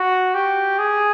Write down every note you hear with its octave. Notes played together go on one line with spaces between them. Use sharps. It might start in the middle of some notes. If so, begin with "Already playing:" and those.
Already playing: F#4
G4
G#4